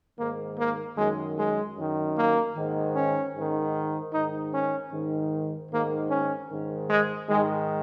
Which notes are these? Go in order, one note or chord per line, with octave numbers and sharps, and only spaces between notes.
G#2 D#3 A#3
A#3
F#2 D#3 G#3
G#3
F#2 D#3
A#3
G#2 D#3
C#4
G#2 D#3
G#2 D#3 D#4
C#4
G#2 D#3
G#2 D#3 A#3
C#4
G#2 D#3
G#3
G#2 D#3 G#3